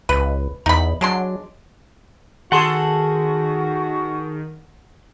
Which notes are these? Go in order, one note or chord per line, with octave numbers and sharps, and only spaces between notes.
C#2 B4
E2 D#4 B5
F#3 G#3 D4 C6
D#3 F#4 G#4 A4 F#5 C6